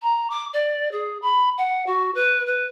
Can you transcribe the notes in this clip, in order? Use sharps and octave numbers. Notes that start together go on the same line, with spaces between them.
A#5
D6
D5
G#4
B5
F#5
F#4
B4
B4